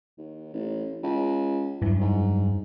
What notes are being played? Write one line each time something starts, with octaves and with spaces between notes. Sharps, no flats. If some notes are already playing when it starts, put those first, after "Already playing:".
D#2
A1
C#2
G2 E3 F#3
G#2